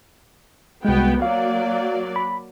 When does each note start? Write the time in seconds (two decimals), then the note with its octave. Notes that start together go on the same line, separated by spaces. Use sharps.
0.85 C2 G#3 B3 F#4 G5
1.22 F#3 A#3 D5 F5
2.16 B5